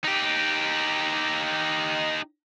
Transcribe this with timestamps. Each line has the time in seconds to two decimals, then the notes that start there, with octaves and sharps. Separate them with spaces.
0.05 D#4 G4